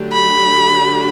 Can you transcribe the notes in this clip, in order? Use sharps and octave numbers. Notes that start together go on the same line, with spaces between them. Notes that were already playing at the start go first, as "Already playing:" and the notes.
Already playing: D3 F#3 A3 D4 G4
B5